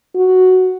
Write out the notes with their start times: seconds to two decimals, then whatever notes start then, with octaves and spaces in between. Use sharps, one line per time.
0.15 F#4